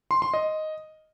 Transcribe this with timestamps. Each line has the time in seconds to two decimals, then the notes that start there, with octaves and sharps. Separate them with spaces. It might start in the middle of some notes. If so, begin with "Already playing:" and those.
0.11 C6
0.22 C6
0.34 D#5